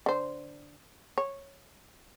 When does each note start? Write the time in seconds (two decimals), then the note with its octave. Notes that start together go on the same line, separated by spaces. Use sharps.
0.06 D3 C5
1.18 C#5